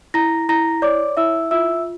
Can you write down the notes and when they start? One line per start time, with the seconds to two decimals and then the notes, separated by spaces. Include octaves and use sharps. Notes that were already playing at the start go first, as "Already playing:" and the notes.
0.14 E4 A#5 A#6
0.49 E4 A#5 A#6
0.82 C#5 D5 D6
1.17 E4 E5 E6
1.51 F4 E5 E6